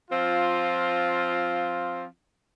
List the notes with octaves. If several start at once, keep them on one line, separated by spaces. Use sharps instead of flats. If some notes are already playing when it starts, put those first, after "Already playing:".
F3 C4 F4